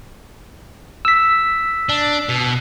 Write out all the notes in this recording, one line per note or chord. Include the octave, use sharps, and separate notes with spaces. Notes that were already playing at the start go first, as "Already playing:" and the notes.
E6 B6
D4
B2